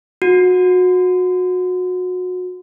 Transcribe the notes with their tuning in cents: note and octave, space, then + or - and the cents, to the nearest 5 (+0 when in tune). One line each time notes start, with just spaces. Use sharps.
F#4 -25